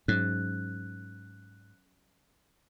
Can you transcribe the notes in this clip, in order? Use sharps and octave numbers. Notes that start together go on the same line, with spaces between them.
G#2 F#3 C#4 F#6